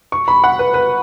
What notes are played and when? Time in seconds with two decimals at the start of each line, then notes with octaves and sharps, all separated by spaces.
0.12 C#6
0.28 B5
0.44 F#5
0.59 B4
0.74 B4